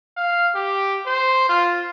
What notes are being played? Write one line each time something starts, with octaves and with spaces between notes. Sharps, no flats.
F5
G4
C5
F4